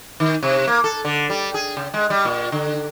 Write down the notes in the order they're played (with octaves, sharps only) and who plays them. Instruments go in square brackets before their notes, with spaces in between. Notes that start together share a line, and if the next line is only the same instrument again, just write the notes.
[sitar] D#3
C3
A#3
A4
D3
G3
G#4
C#3
G#3
G3
A#2
D3